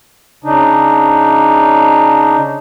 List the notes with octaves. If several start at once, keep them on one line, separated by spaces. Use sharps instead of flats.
C#3 D4 D#4